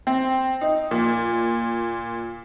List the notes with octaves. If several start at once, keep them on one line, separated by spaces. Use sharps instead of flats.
C4
D#4
A#2